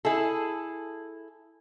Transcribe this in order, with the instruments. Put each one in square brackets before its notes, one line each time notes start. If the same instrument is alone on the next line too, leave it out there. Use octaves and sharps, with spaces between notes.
[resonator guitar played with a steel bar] E4 G#4 A4